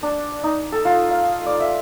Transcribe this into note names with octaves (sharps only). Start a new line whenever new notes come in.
D4
D#4
A4
F4
F5
D5
E5